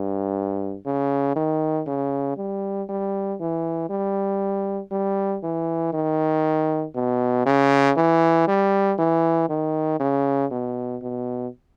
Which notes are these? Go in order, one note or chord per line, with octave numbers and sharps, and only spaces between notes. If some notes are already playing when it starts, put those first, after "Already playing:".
Already playing: G2
C#3
D#3
C#3
G3
G3
E3
G3
G3
E3
D#3
B2
C#3
E3
G3
E3
D#3
C#3
B2
B2